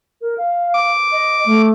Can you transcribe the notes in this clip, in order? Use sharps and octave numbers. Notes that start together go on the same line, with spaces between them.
A#4
F5
D6
D#5
A3